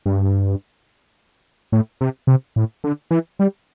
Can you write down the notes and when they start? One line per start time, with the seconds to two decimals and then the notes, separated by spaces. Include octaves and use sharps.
0.06 G2
1.72 A2
2.01 C3
2.27 C3
2.56 A2
2.84 D3
3.11 E3
3.39 G3